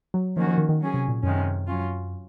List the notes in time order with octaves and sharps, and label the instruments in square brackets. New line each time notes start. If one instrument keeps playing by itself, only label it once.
[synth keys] F#3
[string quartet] D#3 A#3 C#4 F#4 [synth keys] F3
[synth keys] F3
D#3
D#3
[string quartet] F#3 C#4 G#4
[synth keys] C3
A#2
[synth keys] F#2 [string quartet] C3 D#3 G#3 C#4
[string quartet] F#3 C#4 F4